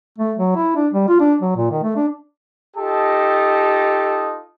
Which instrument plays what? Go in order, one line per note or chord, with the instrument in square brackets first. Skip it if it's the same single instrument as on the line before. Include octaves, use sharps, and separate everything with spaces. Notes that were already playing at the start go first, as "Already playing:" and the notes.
[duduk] A3
F#3
E4
D4
G3
F4
D4
F#3
A#2
D#3
A3
D4
[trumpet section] D#4 F4 G4 A4 D#5 A5